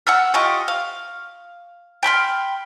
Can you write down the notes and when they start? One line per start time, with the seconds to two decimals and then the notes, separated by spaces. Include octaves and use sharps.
0.07 F#5 C#6 E6 F6
0.34 F4 G4 D#5 C#6
0.68 F5
2.03 G5 B5 C6 F6